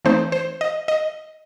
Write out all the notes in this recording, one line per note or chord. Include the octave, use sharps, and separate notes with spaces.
E3 A3 C4 D#4 C5
C5
D#5
D#5